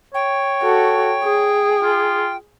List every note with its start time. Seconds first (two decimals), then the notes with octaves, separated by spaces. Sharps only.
0.14 C#5 G5
0.63 F#4 A4
1.23 G#4
1.82 F4